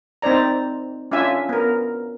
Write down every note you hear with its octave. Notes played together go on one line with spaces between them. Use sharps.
C4 D#4 C5 D5 A#5
C#4 D4 F4 E5 G#5
B3 A#4